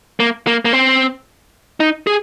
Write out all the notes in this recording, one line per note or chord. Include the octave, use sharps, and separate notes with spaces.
A#3
A#3
A#3
C4
D#4
G#4